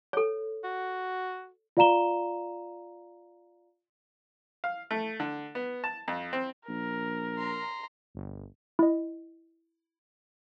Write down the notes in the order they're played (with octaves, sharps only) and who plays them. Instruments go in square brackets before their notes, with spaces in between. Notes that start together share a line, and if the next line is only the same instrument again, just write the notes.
[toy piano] A4 C#5
[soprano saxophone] F#4
[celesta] F4 D5 F5 A#5 E7 G7
[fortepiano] F5
A3
D3
B3
A5
F2
C4
[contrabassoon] A#1 [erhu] A#4
[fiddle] A#5 C6
[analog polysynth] G1
[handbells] E4 D#5